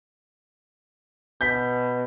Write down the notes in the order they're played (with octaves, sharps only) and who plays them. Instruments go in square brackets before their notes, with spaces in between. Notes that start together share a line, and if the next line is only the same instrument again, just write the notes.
[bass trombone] B2 [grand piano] G6 B6